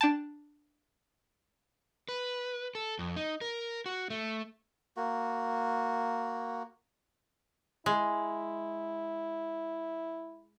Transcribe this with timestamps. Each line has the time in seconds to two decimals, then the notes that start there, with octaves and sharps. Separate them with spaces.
0.01 D4 G5 A5
2.09 B4
2.75 A4
2.99 F2
3.16 D#4
3.41 A#4
3.86 F#4
4.10 A3
4.97 A#3 F#4
7.86 G#3 E4